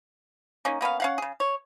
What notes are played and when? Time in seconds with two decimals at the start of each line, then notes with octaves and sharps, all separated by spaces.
0.65 A#3 C#4 D#4
0.81 A#3 B3 C#4 F5
1.00 C#4 F5 F#5
1.18 C#3 G#4
1.40 C#5